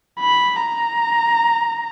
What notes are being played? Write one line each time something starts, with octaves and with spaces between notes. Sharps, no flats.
B5
A#5